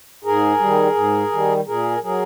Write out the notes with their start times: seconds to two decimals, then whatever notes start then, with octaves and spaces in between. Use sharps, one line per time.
0.24 G#2 G#4 A#4
0.59 D#3 G3
0.95 G#2
1.32 D#3 G3
1.67 A#2 G#4 A#4
2.03 F#3 G#4 A#4